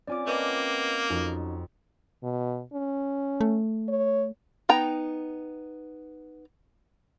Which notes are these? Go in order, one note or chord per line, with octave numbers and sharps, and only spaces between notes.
C4 C#4 F4 D5 G#5 D6
A#3 B4 D#5 F#5 G5 A5 D6
F2 C#4 D#4 F#4
B2
C#4
A3
C#5
B3 D#4 G5 A#5